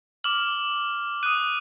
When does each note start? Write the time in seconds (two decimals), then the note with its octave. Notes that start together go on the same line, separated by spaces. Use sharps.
0.24 D6 F6 F#7
1.23 D#6 F#6 D#7